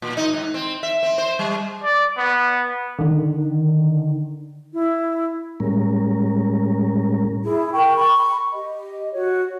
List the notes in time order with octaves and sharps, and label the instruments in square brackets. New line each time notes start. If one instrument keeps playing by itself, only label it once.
[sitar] A#2
D#4
G#2
C4
E5
C4
C5
G3
[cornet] D5
B3
[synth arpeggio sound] D3 D#3
[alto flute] E4
[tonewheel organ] A2 G3 G#3 C#4 A#4
[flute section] E4 G#4
A#4 G5 C#6
B5 C#6
G4 D#5
F#4 C#5